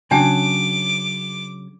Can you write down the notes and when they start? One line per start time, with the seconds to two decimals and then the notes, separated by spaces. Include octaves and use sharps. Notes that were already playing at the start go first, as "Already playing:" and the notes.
0.11 C#3 F#3 D4 G5 A5 D6